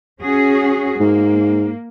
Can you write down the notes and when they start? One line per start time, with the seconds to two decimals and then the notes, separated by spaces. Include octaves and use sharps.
0.20 C#4 F#4 G#4
1.00 G#2 A#3